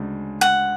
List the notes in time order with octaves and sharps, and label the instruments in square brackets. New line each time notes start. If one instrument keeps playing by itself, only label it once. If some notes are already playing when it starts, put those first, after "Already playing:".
Already playing: [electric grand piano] D2 C#3 G#3 D4
[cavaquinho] F#5